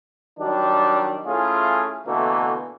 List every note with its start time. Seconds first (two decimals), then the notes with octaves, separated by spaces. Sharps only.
0.39 D#3 F#3 G3 D4
1.26 A3 C#4 E4 F4 G#4
2.06 B2 D3 E3 A3 A#3